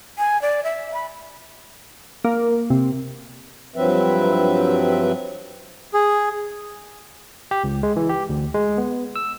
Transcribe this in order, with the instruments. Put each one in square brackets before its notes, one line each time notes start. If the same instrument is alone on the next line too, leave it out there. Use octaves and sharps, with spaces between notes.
[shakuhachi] G#5
D5
E5
B5
[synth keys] A#3
C3
[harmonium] G2 F3 F#3 C4 B4 E5
[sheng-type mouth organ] G#4
[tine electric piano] G4
C#2
G#3
E3
G4
D2
G#3
B3
E6